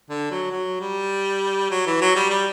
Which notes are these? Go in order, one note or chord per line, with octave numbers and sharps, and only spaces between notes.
D3
F#3
F#3
G3
F#3
E3
F#3
G3
G3